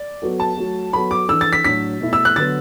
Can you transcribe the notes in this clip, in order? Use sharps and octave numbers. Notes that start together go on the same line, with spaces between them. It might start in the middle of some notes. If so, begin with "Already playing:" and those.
Already playing: D5
F#3 B3 F#4 A4
A5
F#3 A3 F#4
F#3 B3 F#4 A4 B5
D6
E3 D4 A4 E6
A6
B6
A2 F#3 D4 F#4 B6
B2 A3 E4
E6
F#6
D3 F#3 B3 A6